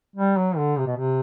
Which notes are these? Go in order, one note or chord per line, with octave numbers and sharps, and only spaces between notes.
G3
F#3
D3
C3
B2
C3